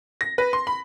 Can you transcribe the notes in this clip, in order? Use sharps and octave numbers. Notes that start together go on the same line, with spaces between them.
A#6
B4
C6
B5